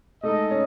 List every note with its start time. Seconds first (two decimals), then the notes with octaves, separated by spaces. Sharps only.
0.23 G#3 A3 D#4 A4 D#5
0.51 C#4